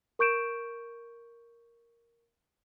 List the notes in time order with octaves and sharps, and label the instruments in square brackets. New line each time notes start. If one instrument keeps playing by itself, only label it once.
[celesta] A#4 C#6 G6 D7 E7